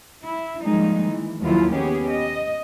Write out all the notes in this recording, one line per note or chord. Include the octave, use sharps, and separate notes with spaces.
E4
D#3 F3 G3 G#3 A#3 D#4
E3
D#2 F3 F#3 B3 E4 F4
B3 C#4 G4 G#4
D#5